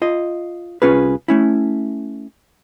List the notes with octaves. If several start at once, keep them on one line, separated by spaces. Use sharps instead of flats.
F4 D#5
C2 C#4 F4 G#4 B4
A3 C#4 E4